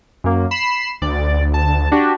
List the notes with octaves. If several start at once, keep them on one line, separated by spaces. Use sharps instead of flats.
F#2 A#3
B5 C7 E7
D2 D5
A5
D4 F#4 G4